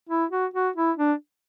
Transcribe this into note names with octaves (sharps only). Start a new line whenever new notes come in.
E4
F#4
F#4
E4
D4